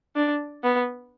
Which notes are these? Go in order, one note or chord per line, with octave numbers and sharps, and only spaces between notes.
D4
B3